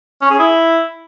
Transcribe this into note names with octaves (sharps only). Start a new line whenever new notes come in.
C#4
G#4
E4